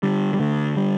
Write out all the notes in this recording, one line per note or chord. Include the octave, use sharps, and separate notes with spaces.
D3 G3
G3
D3 A3
G3